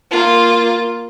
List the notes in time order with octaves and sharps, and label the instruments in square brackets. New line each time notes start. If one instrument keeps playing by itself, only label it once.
[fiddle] A#3 F4